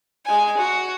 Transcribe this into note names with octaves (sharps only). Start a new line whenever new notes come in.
G#3 G#5
F#4